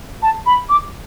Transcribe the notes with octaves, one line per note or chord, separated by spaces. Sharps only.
A5
B5
D6